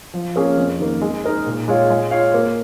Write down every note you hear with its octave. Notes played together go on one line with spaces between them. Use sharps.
F3
A#3 C#4 G#4 F5
F2
D#3 A#3
G#3
D#4 A#4 D#5
A#2
G#3 F4 C#5 F5
G#3
F4 C#5 F5
A#3